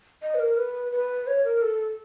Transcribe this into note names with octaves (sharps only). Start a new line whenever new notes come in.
D#5
B4
A#4
B4
B4
C#5
A#4
A4